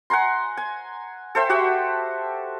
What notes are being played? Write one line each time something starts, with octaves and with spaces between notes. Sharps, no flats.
F#5 G#5 A#5 C6
G#5
A4 C5 E5 G5
F#4 G4 E5 F#5